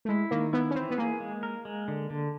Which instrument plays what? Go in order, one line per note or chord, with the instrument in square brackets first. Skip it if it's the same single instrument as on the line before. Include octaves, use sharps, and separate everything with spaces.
[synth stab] A3
[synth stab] G#3 [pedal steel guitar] E4
[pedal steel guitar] D#3 [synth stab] A#3
[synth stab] B3 [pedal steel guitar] E4
[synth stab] C#4
[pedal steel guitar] E3 [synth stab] C4
[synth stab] B3
[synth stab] A#3 [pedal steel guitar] G#4
[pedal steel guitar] G#3
A#4
G#3
D3
D3